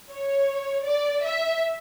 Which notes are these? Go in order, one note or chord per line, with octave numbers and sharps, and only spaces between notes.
C#5
D5
E5